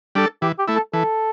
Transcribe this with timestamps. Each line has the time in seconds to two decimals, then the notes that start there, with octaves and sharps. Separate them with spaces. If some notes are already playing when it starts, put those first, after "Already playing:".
0.15 G3 D4 A4
0.42 E3 G4
0.59 G4
0.68 A3 E4
0.76 A4
0.93 E3 A4